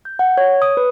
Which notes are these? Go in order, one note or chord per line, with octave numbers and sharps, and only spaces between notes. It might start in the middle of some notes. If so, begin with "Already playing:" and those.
G6
F#5
C#5
D#6
B4